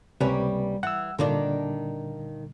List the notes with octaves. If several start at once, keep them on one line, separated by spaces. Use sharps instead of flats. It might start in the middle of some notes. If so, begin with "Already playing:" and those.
C#2 C3 G3 A#3 C#4 B4
E3 F#5 E6
A#2 D3 D#3 G3 A#3 D4